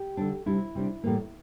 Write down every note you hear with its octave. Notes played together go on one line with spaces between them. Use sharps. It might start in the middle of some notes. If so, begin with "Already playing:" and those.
Already playing: G4
D3 G3 D4
C3 G3 D4 E4
C3 G3 D4
A2 E3 G3 A#3